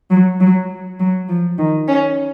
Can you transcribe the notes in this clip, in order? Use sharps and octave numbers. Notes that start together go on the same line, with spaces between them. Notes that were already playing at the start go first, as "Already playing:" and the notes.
F#3
F#3
F#3
F3
D#3
C#4